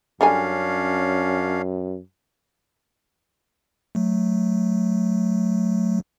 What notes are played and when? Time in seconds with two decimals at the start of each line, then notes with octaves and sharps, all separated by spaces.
0.21 F#2 D3 G3 C#4 D4 F5 G#5
3.95 F#3 A3